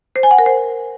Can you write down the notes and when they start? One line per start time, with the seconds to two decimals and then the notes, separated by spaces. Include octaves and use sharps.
0.16 C5
0.23 G#5
0.31 F#5
0.39 A#4
0.46 C5